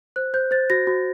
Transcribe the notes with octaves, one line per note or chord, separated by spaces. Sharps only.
C5 F#6
C5 G6
C5 A6
F#4 A#6
F#4